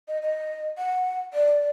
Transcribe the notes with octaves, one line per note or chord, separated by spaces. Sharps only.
D#5
D#5
F#5
D5